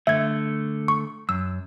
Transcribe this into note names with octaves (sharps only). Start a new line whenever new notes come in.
D3 A3 E5 G#6
C#6
F#2 E6